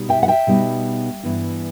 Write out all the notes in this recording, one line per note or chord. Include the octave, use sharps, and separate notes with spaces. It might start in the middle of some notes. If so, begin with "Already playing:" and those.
Already playing: B2 G3 D#4
E5 G5
F#5
E5 G5
B2 G3 B3 D#4
G2 E3 B3 E4